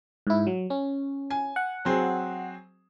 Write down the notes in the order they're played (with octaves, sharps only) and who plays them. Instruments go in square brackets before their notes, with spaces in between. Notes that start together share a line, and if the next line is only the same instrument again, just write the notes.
[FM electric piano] G#2 E4
F#3
C#4
[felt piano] G#5
[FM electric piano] F#5
[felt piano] F#3 C4 G#4